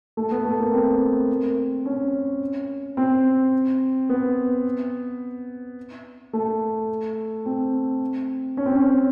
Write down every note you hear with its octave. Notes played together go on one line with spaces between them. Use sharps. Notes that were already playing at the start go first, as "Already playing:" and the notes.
A3
B3
A3
A#3
C4
C#4
C4
B3
A3
C4
C#4
C4
C#4